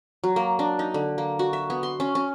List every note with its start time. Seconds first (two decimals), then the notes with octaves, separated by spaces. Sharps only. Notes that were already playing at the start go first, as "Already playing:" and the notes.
0.24 F#3
0.36 A#3
0.59 D4
0.79 D#4
0.94 D3
1.18 A#3
1.39 F#4
1.53 E5
1.70 B3
1.83 C6
2.00 C#4
2.15 C#4